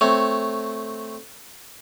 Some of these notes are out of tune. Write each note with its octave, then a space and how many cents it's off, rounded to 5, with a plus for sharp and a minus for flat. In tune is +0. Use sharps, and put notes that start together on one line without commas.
A3 +0 C4 +0 C#5 +0